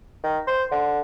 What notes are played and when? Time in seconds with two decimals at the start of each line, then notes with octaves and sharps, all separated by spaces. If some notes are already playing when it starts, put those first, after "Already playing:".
0.24 D#3
0.47 C5
0.71 D3